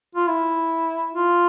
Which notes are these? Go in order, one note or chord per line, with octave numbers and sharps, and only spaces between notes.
F4
E4
F4